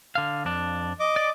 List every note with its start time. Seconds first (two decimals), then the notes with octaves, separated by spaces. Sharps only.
0.15 D3 F5
0.45 F2 D4
1.00 D#5 D6
1.16 D5